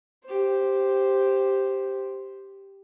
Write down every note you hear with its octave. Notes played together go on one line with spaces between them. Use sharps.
G4 C5